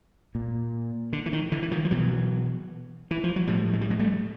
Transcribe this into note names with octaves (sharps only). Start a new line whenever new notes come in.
A#2
D3
E3
D#3
D3 E3
E3
D#3 F3
F3
B2 E3 F#3
E3
F3
F#3
A2 F3 G3
G#3
G3
F#3 G#3
G3 A3